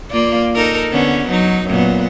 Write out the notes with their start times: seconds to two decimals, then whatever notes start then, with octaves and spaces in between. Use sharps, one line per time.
0.11 A#3 F4 D5
0.55 D#4 A4 A#4
0.92 D3 B3 C#4
1.28 F#3 D#4
1.66 F#2 A#2 B3